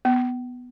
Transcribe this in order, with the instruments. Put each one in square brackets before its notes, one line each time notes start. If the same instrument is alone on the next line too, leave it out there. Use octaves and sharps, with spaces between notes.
[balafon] B3